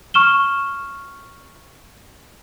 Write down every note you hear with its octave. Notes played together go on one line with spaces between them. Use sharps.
C#6 F6 E7 G7